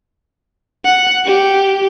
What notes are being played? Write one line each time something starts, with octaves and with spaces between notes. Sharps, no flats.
F#5
G4